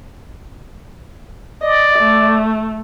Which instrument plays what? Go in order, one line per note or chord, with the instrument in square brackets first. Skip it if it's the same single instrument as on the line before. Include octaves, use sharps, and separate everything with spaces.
[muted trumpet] D5 [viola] D#5
[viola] A3